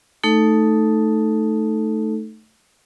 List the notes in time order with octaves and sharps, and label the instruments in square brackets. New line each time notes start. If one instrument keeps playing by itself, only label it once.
[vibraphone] A3 D#4 A4